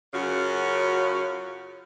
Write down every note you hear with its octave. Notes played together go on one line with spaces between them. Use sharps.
F#2 C#3 C#4 F4 F#4